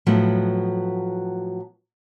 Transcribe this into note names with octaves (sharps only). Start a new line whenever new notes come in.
A2 F3 F#3 B3